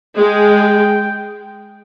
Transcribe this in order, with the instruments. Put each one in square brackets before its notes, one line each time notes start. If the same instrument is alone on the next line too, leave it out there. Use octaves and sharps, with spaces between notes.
[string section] G#3 [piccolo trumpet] G5